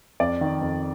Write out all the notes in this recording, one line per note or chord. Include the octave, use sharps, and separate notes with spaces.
F2 D5
D#3
F2